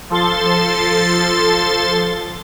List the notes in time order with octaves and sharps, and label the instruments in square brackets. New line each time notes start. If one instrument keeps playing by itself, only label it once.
[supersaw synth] F3 A4 C6 A6